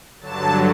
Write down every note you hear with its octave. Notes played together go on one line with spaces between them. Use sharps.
G2 D3 F#3 A5